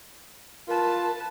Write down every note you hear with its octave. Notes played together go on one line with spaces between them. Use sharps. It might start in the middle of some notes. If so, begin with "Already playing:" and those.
F4 A#4 B4 A5